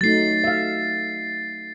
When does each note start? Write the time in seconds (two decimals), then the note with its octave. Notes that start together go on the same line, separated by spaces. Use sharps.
0.01 F#3 A3 D#4 A6 C7
0.44 E5 F5